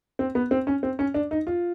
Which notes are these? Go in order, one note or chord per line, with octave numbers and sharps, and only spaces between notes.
C4
B3
C4
C#4
C4
C#4
D4
D#4
F4